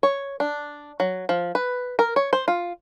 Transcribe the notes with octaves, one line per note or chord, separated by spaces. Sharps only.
C#5
D4
F#3
F3
B4
A#4
C#5
C5
F4